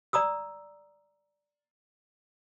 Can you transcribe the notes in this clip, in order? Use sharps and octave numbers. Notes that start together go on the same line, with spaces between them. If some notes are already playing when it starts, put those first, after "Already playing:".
D5 A#5 D#6 E6